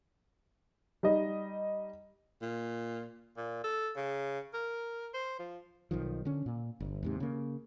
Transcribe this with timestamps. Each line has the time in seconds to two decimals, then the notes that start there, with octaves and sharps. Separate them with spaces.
1.03 G3 D#4 D#5
2.42 A#2
3.37 A#2
3.64 A4
3.96 C#3
4.54 A#4
5.13 C5
5.39 F3
5.91 B1 D#3 F3
6.25 D3 C#4
6.46 A#2
6.80 G1
7.03 D#2 G#2 C3
7.20 C#3 A#3